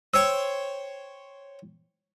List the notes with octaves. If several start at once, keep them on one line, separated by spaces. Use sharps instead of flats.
C5 C#5 G5 E6